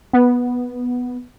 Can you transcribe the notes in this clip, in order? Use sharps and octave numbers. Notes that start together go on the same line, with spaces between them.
B3